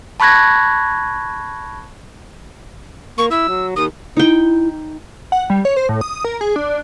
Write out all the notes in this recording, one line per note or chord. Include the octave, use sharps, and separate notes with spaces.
A5 B5 C#6 F#6 G#6 A#6
A#3 C#6
E4 E6
F#3
D#2 D#6
D#4 E4 G5
F#5
G3
C#5
C5
A2
D#6
A#4
G#4
D4